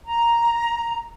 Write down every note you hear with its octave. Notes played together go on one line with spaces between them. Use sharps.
A#5